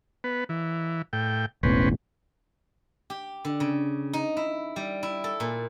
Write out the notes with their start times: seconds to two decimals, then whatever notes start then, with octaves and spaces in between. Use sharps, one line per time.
0.24 B3 B4
0.49 E3
1.13 A2 G5
1.63 E1 A1 E2 C4 C#4 B4
3.10 G4
3.45 D3
3.60 C#3
4.13 D#4
4.37 E4
4.76 G3
5.03 E4
5.24 A4
5.40 A#2